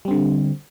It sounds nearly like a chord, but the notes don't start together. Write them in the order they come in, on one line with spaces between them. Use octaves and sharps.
G3 C4 D3